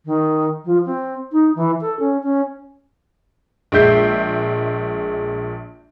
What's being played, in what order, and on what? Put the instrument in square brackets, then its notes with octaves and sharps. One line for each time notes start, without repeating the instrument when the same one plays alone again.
[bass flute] D#3
F3
C4
D#4
E3
A4
C#4
C#4
[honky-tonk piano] A#1 G#3 E5 G6 C7